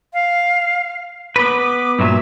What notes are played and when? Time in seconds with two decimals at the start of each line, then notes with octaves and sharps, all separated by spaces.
0.13 F5
1.36 B3 B4 D6
1.99 G2 A#2 F#3 E5